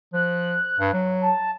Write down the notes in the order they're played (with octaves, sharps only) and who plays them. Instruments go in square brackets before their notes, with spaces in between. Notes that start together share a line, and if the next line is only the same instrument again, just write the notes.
[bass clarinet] F3 [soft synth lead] F#6
[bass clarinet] G2
F#3
[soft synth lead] A5